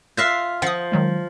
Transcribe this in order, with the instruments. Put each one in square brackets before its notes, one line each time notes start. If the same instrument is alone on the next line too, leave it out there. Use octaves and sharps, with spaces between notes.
[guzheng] F4 E5 F5 [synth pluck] F#6 A#6
[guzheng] F3 [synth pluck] F#5 D#6
[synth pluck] D#3 F#3 G#3